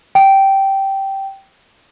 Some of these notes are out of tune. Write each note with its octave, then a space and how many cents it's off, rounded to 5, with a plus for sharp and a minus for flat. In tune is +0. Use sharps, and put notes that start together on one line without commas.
G5 -10